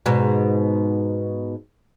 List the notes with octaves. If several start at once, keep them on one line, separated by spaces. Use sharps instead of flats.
G#2 B2